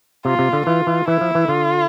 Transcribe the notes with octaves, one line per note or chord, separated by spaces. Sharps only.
C3 F4
C3
D3
E3 F4
E3
E3 E4
F3
E3
D3 F4